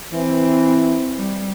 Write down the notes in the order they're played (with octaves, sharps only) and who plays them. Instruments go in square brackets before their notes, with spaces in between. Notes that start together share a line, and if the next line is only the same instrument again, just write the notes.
[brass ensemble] E3 [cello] C4
[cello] G3